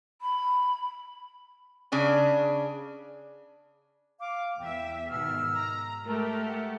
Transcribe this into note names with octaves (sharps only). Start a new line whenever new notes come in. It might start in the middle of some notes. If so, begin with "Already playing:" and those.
B5
C#3 D4 G#5
F5 D6
E2 E5 G5
G#2 B2 D#3 E6 F6
A#5
G#3 A3 G4 A#4
F#5